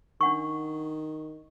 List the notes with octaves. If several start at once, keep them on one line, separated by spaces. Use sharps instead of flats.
D#3 D4 F#5 C#6